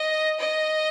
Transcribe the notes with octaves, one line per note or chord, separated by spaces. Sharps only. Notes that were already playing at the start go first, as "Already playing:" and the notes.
Already playing: D#5
D#5